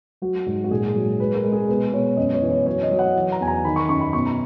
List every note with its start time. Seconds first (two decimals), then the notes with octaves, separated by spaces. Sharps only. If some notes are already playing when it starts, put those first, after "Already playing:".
0.22 F#3 F#4
0.46 G#2
0.64 F#4
0.71 A#2 G#4
0.94 F#3
1.19 G#3 B4
1.35 A#4
1.44 G#3
1.53 G#4
1.69 B2 B4
1.92 B2 C#5
2.17 F#2 D#5
2.34 C#5
2.42 E3
2.50 C#5
2.66 F#3 C#5
2.83 D#5
2.91 F#3
2.99 F#5
3.16 E3
3.32 A#5
3.41 E2 G#5
3.48 A#5
3.65 D#3 B5
3.76 C#6
3.89 F#2 C#6
4.01 B5
4.13 B2 C#6
4.26 A#5